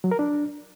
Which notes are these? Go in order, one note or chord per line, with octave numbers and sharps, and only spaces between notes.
F#3
A#4
D4